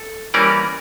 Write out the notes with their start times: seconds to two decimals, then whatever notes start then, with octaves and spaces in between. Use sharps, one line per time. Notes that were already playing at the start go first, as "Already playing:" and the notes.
Already playing: A4
0.34 E3 G3 A#3 C#4 A#4 D5